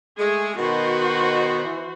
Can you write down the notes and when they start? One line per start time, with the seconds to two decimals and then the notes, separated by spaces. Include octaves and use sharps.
0.18 G#3 A3 G#4
0.57 B2 D#3 F#4 C5
1.64 E3